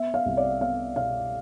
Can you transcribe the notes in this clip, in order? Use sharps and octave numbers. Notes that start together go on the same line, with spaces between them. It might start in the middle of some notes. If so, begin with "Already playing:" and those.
Already playing: B3 E5
F5
C2
D5
B3 F5
B2 F5